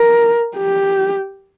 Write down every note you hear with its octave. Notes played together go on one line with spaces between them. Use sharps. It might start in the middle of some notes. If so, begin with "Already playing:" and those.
Already playing: A#4
G4